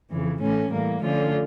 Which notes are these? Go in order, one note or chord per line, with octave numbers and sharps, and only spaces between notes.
F2 C#3 E3
A2 E3 A3 C#4
A2 E3 G3 A#3
D3 F3 A3 C#4 F4